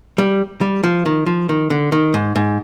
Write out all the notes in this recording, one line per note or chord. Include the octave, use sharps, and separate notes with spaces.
G3
G3
F3
D#3
F3
D#3
D3
D#3
G#2
G#2